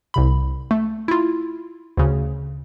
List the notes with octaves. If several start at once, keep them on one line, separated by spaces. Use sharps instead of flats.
C2 C3 B5
A3
E4 F4
D2 C#3